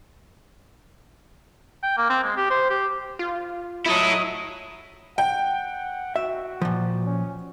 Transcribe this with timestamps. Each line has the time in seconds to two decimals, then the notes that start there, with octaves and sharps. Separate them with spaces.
1.83 G5
1.97 A#3
2.10 C4
2.24 G#3
2.37 G4
2.50 C5
2.70 G4
3.19 F4
3.86 F#3 E4 A4 D#5
5.18 F#5 G5
6.16 F#4 E5
6.62 A#2 F3
7.05 C#4